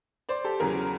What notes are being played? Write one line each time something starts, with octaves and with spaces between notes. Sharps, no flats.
C5 D5
G4 A4
E2 C#3 F#3 G#4 A#4